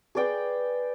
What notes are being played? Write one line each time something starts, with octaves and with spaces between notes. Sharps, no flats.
G#4 B4 D5 G5